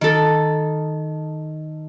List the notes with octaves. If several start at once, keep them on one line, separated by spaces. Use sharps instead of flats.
D#3 A4